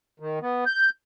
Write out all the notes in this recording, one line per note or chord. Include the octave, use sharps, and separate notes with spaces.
D#3
B3
G6